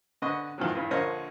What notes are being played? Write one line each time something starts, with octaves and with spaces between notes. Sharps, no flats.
D3 B3 D#5 C#6 D#6
E2 A2 D#3 F3 F#3
E2 G2 E3
A#1 D3 A#4 C5 C#5 D#5